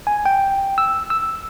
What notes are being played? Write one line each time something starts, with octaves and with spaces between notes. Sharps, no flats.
G#5
G5
E6
E6